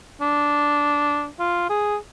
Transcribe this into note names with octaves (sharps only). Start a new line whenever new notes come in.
D4
F4
G#4